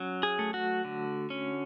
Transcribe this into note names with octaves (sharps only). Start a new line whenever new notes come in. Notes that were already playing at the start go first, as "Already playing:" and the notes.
Already playing: F#3 C#4
G#4
A3
F#4
D3
C#4